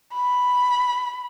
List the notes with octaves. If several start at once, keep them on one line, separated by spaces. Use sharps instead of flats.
B5